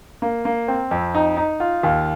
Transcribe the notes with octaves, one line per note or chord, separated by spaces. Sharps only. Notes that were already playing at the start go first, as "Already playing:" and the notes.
A#3
A#3
C4
F2
D#4
D#4
F4
D#2